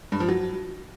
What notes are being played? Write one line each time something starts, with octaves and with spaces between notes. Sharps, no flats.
G2
F3
F#3